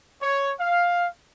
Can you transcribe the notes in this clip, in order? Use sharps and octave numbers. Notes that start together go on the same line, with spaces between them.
C#5
F5